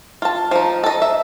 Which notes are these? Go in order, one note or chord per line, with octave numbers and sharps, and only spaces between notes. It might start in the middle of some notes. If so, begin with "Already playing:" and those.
F4 A5
F3 D#4
A4 D#5
E5